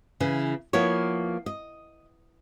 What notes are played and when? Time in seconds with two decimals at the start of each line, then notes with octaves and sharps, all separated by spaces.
0.20 C#3 E3
0.73 F3 A#3 B3 E4 C#5
1.46 D#5